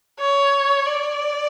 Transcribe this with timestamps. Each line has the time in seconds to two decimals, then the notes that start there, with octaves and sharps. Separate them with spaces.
0.20 C#5
0.86 D5